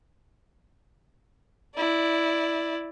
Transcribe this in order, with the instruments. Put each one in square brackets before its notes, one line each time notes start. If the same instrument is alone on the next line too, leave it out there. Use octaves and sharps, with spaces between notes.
[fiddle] E4 D5